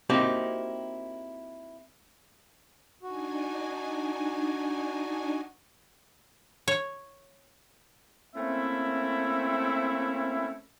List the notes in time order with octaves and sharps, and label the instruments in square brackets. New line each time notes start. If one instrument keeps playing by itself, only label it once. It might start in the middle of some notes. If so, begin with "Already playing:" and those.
[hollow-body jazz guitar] A#3 C4 D#4 E4 F#4 G4
[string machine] D4 D#4 G#5 [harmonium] F#4
[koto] C#5
[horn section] A3 A#3 C4 C#4 E4 E5